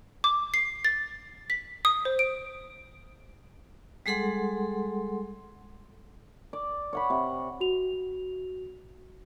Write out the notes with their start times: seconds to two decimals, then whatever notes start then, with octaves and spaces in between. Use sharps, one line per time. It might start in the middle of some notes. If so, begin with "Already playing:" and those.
0.24 D6
0.54 C7
0.85 A6
1.50 B6
1.85 D#6
2.05 C5
2.19 D7
4.06 G3 G#3 G#4 A4 F#5 C6
6.53 D5
6.93 C#5 F#5 B5
7.10 C3
7.61 F#4 F7